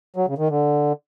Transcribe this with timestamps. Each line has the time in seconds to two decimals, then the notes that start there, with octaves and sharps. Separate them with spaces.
0.16 F#3
0.27 C#3
0.38 D#3
0.49 D3